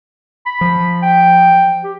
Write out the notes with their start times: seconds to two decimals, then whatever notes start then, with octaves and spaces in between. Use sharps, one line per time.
0.46 B5
0.61 F3
1.02 G5
1.83 G4